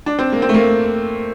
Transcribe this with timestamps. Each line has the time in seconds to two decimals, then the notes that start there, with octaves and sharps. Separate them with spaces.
0.06 D4
0.19 C4
0.32 A#3
0.42 C4
0.49 A3
0.54 A#3